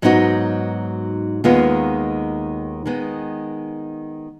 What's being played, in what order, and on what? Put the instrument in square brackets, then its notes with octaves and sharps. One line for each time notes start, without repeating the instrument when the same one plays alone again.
[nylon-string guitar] G#2 F#3 B3 D#4 F#4
D#2 D#3 G#3 B3 F4
D#3 G#3 B3